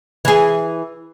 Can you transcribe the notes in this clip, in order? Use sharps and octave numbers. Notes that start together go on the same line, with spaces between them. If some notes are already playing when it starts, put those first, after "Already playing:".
E3 G#4